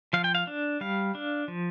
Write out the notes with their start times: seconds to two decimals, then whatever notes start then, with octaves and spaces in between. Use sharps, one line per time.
0.13 F3 F5
0.24 G5
0.35 F5
0.47 D4
0.81 G3 F5
1.15 D4
1.48 F3